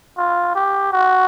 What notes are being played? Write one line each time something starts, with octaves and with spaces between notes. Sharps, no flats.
F4
G4
F#4